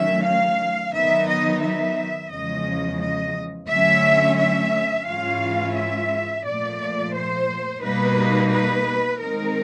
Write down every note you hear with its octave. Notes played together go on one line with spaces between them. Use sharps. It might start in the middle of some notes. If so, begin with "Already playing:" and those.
Already playing: D#3 F#3 A3 C#4 E5
F5
D#3 F#3 B3 D#4 E5
D#5
E5
E2 C#3 F3 G#3 D#5
D#5
D3 F#3 A3 C#4 E5
E5
G#2 E3 G#3 C#4 F4 F5
E5
A#2 F3 A3 D5
C5
B2 G3 A#3 D#4 B4
B4
D#3 G#3 C4 D#4 A#4